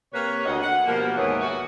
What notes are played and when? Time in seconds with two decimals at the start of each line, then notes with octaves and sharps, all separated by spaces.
0.13 C3 A#3 B4 C#5
0.45 D2 D#5 F#5
0.63 F#5
0.86 B2 F3 G3 A#3
1.16 D#2 G#2 E3 B3 A#4 C#5
1.40 F#4